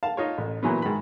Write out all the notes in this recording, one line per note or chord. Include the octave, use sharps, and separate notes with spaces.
F5 A5
D#4 F4 C#5
A1
A#2 E3 F#3 B3
G#2 D#3 B5